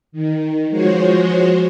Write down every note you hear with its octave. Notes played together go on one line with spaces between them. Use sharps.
D#3
F3 G#3 F#4 C5 C#5